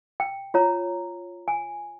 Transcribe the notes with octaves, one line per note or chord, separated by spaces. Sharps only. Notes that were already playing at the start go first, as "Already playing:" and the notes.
G5
F4 C#5 A#5
G#5